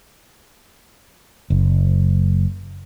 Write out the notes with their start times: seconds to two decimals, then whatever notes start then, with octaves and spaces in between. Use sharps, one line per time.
1.50 F#1